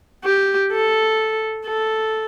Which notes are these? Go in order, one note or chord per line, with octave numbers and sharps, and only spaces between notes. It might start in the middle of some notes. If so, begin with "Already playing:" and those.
G4
A4
A4